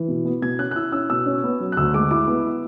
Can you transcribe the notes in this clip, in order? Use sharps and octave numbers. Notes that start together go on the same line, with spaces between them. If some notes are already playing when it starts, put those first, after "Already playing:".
Already playing: E3
B2
B3
B2 G#6
C#4 F#6
F#6
E4 E6
C#4 E6
B2 E6
C#4
B3
F#3
F#6
D2 E6
G#3 D6
E4 D6
B3